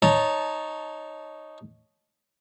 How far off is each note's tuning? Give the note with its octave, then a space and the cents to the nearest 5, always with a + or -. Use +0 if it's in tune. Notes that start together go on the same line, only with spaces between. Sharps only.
D#4 +0 C#5 +0 A5 -15